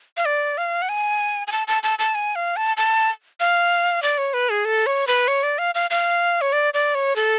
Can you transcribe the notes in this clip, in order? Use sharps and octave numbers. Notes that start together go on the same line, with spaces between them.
F5
D5
F5
F#5
G#5
G#5
A5
A5
A5
A5
G#5
F5
A5
A5
F5
D5
C#5
B4
G#4
A4
C#5
B4
C#5
D5
F5
F5
F5
C#5
D5
D5
C#5
A4